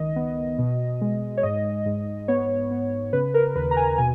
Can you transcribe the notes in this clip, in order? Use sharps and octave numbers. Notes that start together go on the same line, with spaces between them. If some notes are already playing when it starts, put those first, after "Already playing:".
Already playing: C#2 D#3 D#5
B3
B2
G#3
C#5
G#2 D#5
G#2
B3 C#5
B3
C#3 B4
A#4
D#2 B4
A#5
G#5
B2 G#5